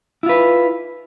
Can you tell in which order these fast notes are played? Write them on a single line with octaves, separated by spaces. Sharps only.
E4 F4 B4